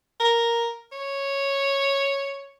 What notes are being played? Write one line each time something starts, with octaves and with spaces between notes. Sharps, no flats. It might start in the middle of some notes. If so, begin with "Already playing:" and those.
A#4
C#5